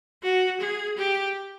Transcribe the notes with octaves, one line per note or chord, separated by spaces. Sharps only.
F#4
G#4
G4